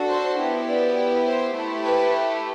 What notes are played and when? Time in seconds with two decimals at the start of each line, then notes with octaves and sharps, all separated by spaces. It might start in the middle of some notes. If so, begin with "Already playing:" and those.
Already playing: D4 F#4 A4
0.10 C5
0.39 B3 E4 G4
0.68 D5
1.25 C5
1.55 A3 E4 G4
1.84 B4